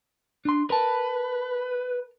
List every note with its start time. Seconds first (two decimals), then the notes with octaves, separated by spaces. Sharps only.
0.45 D4 C6
0.70 A#4 B4 A5